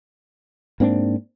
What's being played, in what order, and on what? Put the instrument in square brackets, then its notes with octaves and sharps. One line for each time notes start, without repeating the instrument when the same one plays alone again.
[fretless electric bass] G#2 A#3 C4 D4